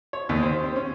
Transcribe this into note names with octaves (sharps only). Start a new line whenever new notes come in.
C#5
D#2
C5
C4
C#4